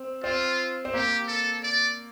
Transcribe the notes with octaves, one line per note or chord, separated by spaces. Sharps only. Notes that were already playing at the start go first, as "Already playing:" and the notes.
Already playing: C4
C4 F4
C4
A#3 G4
A4
D5